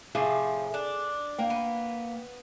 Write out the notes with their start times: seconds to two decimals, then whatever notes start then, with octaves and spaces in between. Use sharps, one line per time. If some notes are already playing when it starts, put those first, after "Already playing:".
0.15 A2 C3 F3 G#4
0.74 D4
1.38 A#3 G5
1.50 B3